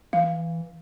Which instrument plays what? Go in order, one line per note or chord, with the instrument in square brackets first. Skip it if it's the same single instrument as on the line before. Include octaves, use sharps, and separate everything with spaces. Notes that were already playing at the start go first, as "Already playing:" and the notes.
[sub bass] E3 [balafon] F5